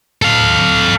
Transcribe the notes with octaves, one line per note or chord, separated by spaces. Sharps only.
A4 F5